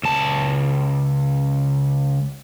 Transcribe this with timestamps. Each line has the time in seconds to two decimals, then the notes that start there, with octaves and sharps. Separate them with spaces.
0.03 C#2 A5